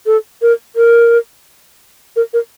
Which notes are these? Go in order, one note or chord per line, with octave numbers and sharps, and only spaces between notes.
A4
A#4
A#4
A#4
A#4